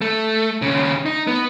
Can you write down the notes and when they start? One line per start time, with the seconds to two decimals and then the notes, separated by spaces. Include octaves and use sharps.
0.01 A3
0.62 D#2 C#3
1.06 D#4
1.27 B3